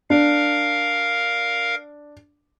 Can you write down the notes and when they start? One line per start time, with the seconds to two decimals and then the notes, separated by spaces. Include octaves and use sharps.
0.10 D4 A#4 F5